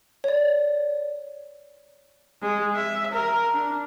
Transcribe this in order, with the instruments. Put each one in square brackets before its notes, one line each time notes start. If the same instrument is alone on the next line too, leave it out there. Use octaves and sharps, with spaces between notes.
[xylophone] C#5 D5
[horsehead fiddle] G#3
E5
A#4
D4